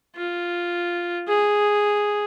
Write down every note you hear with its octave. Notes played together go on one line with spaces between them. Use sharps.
F4
G#4